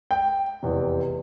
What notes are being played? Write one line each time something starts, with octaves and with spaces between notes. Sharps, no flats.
G5
F1 E2 C3